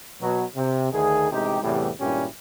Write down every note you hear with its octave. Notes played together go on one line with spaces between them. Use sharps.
B2 F#3
C3
D2 D#3 G#4
A1 C3 G#3 D#4 G4
E2 A2 C3 E3 G3
G#1 G2 A#2 C#4 E4 G4